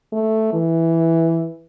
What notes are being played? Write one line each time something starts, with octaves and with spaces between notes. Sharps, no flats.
A3
E3